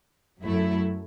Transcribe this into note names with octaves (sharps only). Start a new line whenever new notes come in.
F#2 F#3 A3 E4